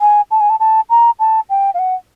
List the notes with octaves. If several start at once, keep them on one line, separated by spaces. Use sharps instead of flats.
G#5
A5
G#5
A5
A5
A#5
A5
G5
F5
F#5